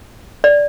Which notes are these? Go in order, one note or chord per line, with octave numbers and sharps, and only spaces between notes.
D5